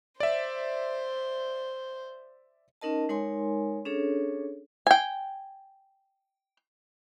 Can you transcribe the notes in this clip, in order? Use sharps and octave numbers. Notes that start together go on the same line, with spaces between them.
C5 D5 E5
C#4 D#4 A#4 D#5 A5
G#3 D#4 A#4 C#5 G#5 C6
C#4 D4 G#4 A4 C#5
G5 G#5